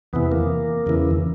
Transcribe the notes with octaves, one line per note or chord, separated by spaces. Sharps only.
E2 C3 E3 B3
A#3
E2 C#3 E3